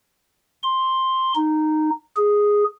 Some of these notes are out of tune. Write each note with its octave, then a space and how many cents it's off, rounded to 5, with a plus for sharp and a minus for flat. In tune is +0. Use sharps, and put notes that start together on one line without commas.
C6 +5
D#4 -10
G#4 -5